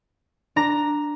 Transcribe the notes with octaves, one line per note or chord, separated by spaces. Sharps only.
D4 A#5 A#6